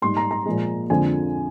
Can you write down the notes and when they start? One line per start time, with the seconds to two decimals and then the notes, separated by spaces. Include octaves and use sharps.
0.02 G#2 G3 C6
0.17 A#5
0.31 A#5
0.46 A#2 F3 G#3
0.90 F2 D3 F3 G#3 G#5